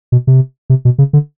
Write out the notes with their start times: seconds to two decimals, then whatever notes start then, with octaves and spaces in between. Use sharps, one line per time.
0.12 B2
0.27 C3
0.70 C3
0.85 B2
0.98 C#3
1.13 D3